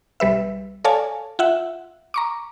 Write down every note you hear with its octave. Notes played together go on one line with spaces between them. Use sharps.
B1 G3 B4 E5
A4 C#5 D5 F5 G#5 A5
F4 E5 F#5
A#5 C#6 D6